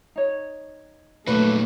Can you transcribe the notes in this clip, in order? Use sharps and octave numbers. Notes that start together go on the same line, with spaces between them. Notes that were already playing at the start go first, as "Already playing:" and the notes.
D#4 C#5
A#2 D#3 F#3 A3 B4